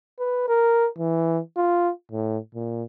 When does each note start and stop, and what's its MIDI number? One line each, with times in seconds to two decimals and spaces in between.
0.19 0.48 71
0.48 0.87 70
0.98 1.39 52
1.57 1.90 65
2.12 2.38 45
2.55 2.83 46